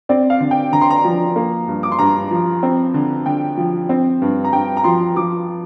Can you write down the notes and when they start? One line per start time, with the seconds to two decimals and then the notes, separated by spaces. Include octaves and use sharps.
0.09 C4 D5
0.30 F5
0.41 D3
0.51 G5
0.72 D3 A#5
0.81 C6
0.90 A#5
1.05 F3
1.36 A#3
1.68 G2
1.83 D6
1.92 C6
1.99 G2 A#5
2.31 F3
2.63 C4
2.94 D3
3.26 D3 G5
3.57 F3
3.89 C4
4.22 G2
4.44 A#5
4.53 G2 G5
4.77 A#5
4.84 F3 C6
5.16 F3 D6